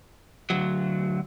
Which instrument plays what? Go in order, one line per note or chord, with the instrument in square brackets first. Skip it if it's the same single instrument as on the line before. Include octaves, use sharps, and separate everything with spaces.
[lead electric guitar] D2 F#3